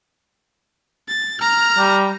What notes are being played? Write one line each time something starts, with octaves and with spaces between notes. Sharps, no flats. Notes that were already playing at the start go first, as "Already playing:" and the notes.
A6
A#5 F6
G3